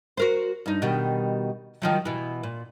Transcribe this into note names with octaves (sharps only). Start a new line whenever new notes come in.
F#4 A#4 C5
G2 D#4
B2 D#3 G3
D#3 F3 F#3
B2 E3
A#2